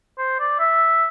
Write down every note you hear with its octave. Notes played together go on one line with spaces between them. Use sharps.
C5
D5
E5